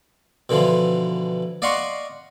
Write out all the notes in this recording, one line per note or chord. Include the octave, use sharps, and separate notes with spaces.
B2 D3 E3 F3
D5 D#5 F5 F#5 C6 C#6